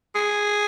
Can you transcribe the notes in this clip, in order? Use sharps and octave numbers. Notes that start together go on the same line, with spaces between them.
G#4